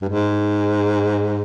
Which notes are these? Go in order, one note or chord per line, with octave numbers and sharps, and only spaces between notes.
G2
G#2